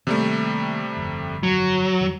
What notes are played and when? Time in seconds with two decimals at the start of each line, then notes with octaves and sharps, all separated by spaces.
0.07 C3 D#3 G3 A3 A#3
0.97 G1 F2
1.43 F#3
2.00 F2 D#3 F3